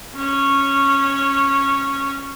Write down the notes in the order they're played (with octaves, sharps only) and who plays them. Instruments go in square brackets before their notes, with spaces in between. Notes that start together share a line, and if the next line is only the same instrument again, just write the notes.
[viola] C#4 C#5